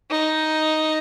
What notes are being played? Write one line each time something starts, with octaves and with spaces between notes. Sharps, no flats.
D#4